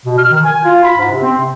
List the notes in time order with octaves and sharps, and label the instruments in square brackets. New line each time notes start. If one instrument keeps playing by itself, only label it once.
[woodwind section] B2
F6
D#3
G#5
F4
B5
G#2
C3
C4
C3